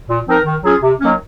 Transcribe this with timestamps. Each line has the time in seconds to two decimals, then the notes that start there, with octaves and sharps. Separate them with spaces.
0.09 A#2
0.27 F3 C4 D#4 A#4
0.45 D#3
0.64 F#3 C#4 F4 G#4
0.83 C3
1.01 D#3 F#3 A#3 C#4